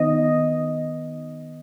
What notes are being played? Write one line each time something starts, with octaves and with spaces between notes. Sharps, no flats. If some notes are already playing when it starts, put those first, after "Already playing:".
Already playing: D#3 B3 D#4 D#5